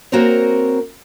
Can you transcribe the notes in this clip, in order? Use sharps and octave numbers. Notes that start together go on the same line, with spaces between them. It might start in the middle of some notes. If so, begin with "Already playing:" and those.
A#3 C4 F#4 A#4 C5 C#5